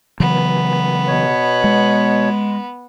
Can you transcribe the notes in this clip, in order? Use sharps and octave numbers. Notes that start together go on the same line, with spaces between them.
C#3 E3 F#3 B3
B2 C#5
G#3